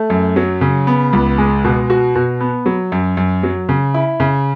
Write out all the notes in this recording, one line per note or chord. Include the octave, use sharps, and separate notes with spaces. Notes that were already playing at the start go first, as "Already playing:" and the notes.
Already playing: A3
F#2
F#3
C#3
B3
C#2
G#3
B2
F#4
B2
B3
F#3
F#2
F#2
F#3
C#3
E4
C#3